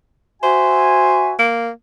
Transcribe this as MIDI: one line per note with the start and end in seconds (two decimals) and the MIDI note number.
0.43 1.33 66
0.43 1.33 72
0.43 1.33 76
0.43 1.33 80
1.39 1.69 58